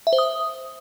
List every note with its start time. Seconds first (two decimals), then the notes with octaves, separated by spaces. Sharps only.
0.07 E5
0.13 C5
0.18 D#6